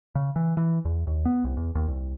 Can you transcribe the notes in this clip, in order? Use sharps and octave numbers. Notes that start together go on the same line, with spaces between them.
C#3
E3
E3
E2
D#2
B3
C2
E2
D#2
C2